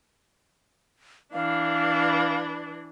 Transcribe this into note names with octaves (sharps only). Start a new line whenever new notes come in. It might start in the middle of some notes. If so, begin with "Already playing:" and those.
E3 D4 F5